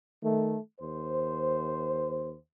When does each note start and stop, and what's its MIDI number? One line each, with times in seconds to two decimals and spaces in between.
0.22 0.57 51
0.22 0.57 57
0.80 2.36 39
0.80 2.36 72